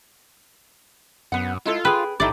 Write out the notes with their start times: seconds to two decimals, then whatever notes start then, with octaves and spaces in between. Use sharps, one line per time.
1.32 F#2 B3 F#5
1.66 G#3 E4 F4 A4
1.85 G#4 B4 G5
2.20 A1 A2 D#4 E4 G4 D5